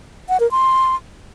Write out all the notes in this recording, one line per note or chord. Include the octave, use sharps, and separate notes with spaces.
F#5
A#4
C6